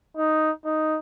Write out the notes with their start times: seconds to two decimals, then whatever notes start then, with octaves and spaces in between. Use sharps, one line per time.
0.17 D#4
0.65 D#4